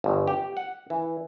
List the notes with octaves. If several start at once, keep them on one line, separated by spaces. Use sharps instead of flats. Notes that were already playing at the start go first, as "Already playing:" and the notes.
G1
G4
F#5
E3